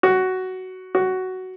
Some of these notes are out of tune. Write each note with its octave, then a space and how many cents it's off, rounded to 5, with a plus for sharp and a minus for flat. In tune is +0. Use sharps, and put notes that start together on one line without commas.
F#4 +10
F#4 +10